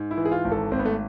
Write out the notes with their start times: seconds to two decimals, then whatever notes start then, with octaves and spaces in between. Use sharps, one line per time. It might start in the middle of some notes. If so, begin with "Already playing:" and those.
Already playing: G#2
0.11 E4
0.18 E3
0.25 G#4
0.32 F4
0.45 G#1
0.51 A4
0.71 G#1 C4
0.79 B3
0.85 A3